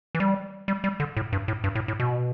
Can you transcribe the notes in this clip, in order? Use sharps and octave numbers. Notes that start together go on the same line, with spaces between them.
E3
G3
G3
G3
D3
A2
G2
A2
G2
A2
A2
B2